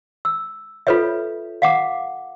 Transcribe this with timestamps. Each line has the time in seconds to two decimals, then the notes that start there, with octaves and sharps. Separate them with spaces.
0.25 E6
0.87 F4 A4 B4 C#5 E5
1.62 F5 F#5 D6